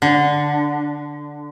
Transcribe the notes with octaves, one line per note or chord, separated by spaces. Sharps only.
D3